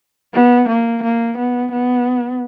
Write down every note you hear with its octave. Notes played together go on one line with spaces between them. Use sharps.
B3
A#3
A#3
B3
B3